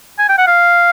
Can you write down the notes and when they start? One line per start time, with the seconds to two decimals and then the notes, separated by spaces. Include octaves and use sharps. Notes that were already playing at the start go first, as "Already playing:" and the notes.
0.19 G#5
0.29 G5
0.38 F#5
0.47 F5